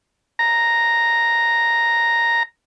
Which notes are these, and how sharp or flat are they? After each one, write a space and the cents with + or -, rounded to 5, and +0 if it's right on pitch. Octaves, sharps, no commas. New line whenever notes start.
A#5 +0